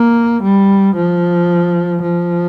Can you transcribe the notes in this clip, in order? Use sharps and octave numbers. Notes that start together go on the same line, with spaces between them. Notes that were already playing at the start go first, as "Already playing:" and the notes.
Already playing: A#3
G3
F3
F3